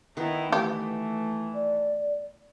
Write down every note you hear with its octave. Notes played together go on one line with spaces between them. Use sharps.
D#3 B3 D#4 E4
E3 A3 G4
D5